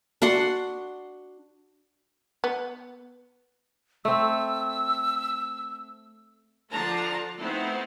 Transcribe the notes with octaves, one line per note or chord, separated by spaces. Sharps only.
D4 F#4 F#5 C6
B3
A3 C4 E6
D3 F3 D4 A5 A#5 C6
A3 B3 C4 D#4 E4 C5